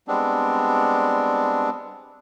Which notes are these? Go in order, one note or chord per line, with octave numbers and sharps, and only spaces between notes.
G3 G#3 B3 C4 D4